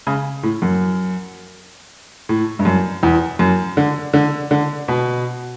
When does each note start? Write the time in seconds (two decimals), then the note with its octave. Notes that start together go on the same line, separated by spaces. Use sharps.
0.07 C#3
0.43 A2
0.62 F#2
2.29 A2
2.59 G2
2.65 F#2
3.03 E2
3.39 F#2
3.77 D3
4.13 D3
4.51 D3
4.88 B2